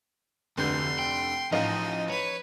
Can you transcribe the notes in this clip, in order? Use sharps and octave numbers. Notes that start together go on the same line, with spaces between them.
F1 D2 D3 C6 G6
G5
A1 F3 D#4 D#5 F5
B4 C#5